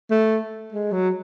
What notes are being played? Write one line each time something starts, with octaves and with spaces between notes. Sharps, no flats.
A3
G#3
F#3